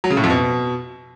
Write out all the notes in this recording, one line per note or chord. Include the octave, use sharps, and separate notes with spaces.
F#3
C#3
A2
F2
B2